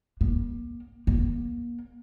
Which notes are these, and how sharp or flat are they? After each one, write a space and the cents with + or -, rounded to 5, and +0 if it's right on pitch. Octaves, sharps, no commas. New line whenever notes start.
A#3 +30
A#3 +35